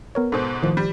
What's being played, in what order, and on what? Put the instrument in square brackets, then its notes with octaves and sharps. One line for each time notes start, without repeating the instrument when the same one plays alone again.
[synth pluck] B3 A#4 C#5
[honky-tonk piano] G#2 B2 [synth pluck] A4 C5
[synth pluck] A2 D#3 F3
[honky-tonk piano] G3